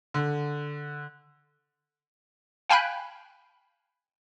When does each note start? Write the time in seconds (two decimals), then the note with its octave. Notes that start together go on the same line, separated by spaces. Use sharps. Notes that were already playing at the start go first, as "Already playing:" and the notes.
0.14 D3
2.69 F5 G5 G#5 B5 F#6